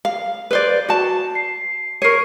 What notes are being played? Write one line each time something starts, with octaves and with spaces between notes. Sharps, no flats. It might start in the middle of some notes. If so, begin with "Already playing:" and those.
F5
B4 C5 D5
F#4 A5
C7
A#4 C#5 C#6 C7 D#7